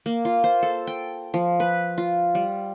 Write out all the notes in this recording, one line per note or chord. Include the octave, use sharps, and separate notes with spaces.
A#3
F4
C5
A4
G5
F3
B4
F4
G3